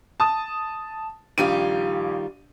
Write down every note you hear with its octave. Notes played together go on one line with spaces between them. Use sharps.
A5 D#6
A#1 D#3 G3 F4 G4 D#7